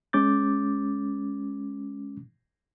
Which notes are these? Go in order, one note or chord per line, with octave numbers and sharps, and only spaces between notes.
G#3 C#4 D6 G6 A6